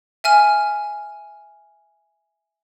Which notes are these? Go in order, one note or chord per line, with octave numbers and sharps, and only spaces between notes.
E5 G#5 F6